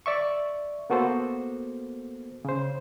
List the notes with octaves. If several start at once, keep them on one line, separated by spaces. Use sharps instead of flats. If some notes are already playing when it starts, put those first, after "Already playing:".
D5 E5 C#6
A#3 B3 F#4 A4 C5
C#3 C5